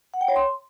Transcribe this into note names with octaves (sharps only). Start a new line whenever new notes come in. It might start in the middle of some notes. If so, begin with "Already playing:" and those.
F#5
G5
C#5
C6